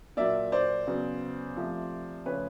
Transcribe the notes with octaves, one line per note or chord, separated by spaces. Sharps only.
A#2 F#3 A#3 D5 E5
C5 D5
C#3 F#3 B3
C3 F3 A3
C#3 F3 A3 B4 C#5